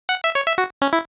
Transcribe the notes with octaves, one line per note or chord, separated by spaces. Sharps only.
F#5
E5
C#5
E5
F#4
C#4
E4